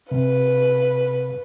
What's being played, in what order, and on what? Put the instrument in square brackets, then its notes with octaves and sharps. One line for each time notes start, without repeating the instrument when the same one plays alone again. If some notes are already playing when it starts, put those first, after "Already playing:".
[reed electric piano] C3 [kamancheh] B4